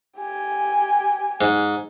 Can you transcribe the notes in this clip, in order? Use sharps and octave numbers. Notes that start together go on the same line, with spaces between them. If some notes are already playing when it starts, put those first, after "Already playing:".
G4 G#5
G#2